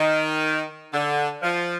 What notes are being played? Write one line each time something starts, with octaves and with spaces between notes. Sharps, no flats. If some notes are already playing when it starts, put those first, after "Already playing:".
Already playing: D#3
D3
F3